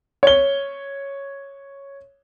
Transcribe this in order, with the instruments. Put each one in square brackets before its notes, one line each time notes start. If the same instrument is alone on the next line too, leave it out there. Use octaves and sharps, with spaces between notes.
[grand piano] C#5 G7